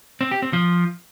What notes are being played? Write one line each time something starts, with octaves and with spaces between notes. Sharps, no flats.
C4
G4
C4
F3